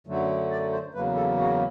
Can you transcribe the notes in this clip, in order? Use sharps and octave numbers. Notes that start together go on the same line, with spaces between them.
F#2 D3 F#3 A3
D5
C5
E2 C#3 F#3 A#3 B4
A4
F#4